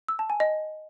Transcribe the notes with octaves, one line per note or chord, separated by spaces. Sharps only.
E6
A5
G#5
D#5